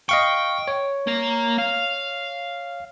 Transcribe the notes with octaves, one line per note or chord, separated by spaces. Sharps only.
D#5 F5 G5 C#6
C#5
A#3 A#5
F5